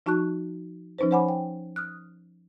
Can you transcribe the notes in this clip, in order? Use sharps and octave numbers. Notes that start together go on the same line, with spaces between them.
F3 D#4 F#4 A5 C#6 F#6
F3 C#4 D#4 B4 C5
C5 C#5 F#5 G#5 B5 D6
G5
D#6 F6 F#6